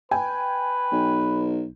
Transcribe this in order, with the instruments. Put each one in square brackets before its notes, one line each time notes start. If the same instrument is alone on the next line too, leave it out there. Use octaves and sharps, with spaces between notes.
[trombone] B4 [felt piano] G5 G#5
[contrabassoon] B1